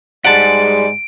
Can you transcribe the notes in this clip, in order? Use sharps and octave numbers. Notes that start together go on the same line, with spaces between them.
G#2 G3 G#3 F#5 A5 D7